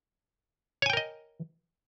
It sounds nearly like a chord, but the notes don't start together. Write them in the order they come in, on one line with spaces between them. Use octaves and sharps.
C#5 G#5 G5 A#4 D#5